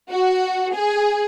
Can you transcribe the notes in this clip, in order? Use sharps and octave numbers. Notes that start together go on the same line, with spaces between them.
F#4
G#4